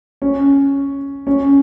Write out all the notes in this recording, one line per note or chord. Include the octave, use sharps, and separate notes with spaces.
C#4
C#4